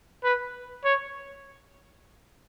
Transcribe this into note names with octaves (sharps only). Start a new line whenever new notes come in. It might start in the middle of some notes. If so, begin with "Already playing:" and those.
B4
C#5